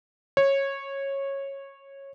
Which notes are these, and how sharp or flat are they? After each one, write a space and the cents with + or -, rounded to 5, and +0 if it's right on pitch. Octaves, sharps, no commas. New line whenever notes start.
C#5 -15